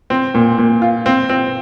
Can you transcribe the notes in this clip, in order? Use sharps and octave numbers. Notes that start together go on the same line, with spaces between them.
C4
A#2
A#2
F4
C4
C4